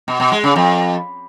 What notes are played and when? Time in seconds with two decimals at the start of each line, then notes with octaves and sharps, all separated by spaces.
0.08 B2
0.20 B2
0.32 G#3
0.44 C#3
0.56 F2